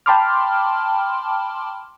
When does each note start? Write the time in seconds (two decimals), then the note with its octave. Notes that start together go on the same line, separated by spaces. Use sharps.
0.06 G5 A5 B5 C6 D6 F6